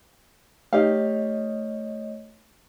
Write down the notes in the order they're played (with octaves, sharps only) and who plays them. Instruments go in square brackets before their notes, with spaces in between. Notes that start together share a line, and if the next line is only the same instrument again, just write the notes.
[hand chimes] A3 C#5 D#5 [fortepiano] D#4 G4 F5